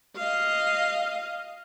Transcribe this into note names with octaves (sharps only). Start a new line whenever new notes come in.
D#5 F5